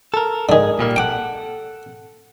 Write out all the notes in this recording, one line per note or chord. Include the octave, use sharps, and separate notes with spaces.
A4 A#4
G#2 D3 D#3 G#4
A#2 G3 A#3
A4 F#5 G5 D6